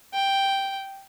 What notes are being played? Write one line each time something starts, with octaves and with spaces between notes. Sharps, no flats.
G5